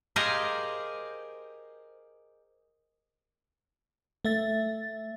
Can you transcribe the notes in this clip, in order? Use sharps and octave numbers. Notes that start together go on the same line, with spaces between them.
G4 G#4 A#4 C5 D#5 F5
A3 E5 A6